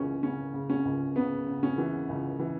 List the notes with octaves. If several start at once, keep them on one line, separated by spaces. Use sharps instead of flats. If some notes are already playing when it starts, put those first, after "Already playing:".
Already playing: C#2 E3 C#4
C#3 C#4
C#3
C#4
C#2
C#3 B3
C#3
C#4
E3
C#2
E3